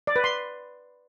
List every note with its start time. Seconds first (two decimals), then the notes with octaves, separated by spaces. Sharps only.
0.07 D5
0.16 B4
0.24 C6